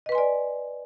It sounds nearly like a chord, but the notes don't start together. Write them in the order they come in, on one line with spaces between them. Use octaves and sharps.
D#5 B4 C6 G#5 D5